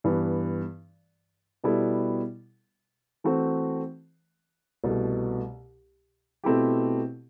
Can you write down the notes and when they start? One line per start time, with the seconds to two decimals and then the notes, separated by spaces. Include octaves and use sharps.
0.04 G2 E3 B3
1.64 B2 G3 B3 E4 A4
3.24 E3 A3 C4 F#4 C5
4.84 C2 B2 A3
6.44 B2 A3 C4 E4 G4